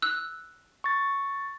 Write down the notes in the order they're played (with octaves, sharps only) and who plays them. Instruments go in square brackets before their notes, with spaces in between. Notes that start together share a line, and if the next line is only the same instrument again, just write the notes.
[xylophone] E6 F#6
[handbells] C#6 A6